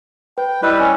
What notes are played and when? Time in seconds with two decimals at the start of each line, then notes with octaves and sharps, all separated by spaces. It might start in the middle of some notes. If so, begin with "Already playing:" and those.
0.38 B4 G5
0.62 G3 E4 B4 D#5 E6
0.79 C#4